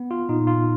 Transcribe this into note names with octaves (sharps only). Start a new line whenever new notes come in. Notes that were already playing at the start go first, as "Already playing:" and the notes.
Already playing: B3
F4
A#2 D#4
F4